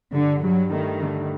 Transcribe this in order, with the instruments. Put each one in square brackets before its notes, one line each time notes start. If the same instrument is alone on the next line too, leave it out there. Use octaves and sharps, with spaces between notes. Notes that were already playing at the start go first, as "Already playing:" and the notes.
[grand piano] G2 [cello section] D3
[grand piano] G2 [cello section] F#3
[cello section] D#3 [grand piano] A3
[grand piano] D3